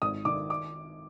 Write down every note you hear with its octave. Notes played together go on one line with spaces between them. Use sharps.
G#1 D#6
D#3 D6
D6